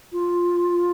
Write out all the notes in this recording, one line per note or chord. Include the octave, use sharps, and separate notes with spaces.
F4